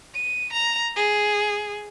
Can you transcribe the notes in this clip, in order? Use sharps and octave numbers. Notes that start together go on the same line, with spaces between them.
D#7
A#5
G#4